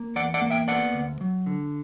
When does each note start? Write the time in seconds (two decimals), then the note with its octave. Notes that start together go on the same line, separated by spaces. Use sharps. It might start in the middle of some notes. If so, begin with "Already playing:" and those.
Already playing: A#3
0.16 E2 D5 F#5
0.34 D5 F#5
0.42 A#3
0.50 E5 G5
0.68 B3 D5 F#5
0.94 D2
1.21 F#3
1.46 D3